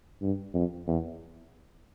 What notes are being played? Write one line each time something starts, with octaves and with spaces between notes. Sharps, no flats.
G2
F2
E2